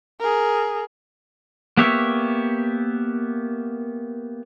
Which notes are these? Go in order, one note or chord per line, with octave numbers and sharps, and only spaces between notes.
G#4 A#4
A#3 B3 G4 C#5 E5